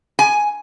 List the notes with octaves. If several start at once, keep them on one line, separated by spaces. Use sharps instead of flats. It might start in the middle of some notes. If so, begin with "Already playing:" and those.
G#5